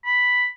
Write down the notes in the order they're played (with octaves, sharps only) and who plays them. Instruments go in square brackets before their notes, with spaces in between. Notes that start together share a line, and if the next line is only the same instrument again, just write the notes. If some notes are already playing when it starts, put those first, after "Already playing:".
[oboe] B5